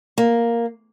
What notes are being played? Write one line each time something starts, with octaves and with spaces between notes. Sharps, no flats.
A#3